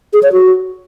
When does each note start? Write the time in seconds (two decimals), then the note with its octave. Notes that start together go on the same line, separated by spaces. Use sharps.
0.13 G#4
0.23 C#5
0.32 F#4